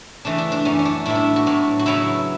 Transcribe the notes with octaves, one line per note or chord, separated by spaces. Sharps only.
C#3 E3 A3 D4
D4
D4
F#2 E3 B3 C#4
C#4
D4
A2 G3 B3 E4
D4
F#4
A2 F#3 B3
F#4
C#3 F#3 B3 E4